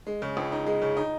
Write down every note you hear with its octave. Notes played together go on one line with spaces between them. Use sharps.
G#3
C#3
C#2
D#4
G#3
C#3
D#4